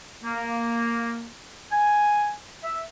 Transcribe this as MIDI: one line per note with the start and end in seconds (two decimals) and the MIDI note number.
0.24 1.26 58
1.72 2.32 80
2.63 2.81 76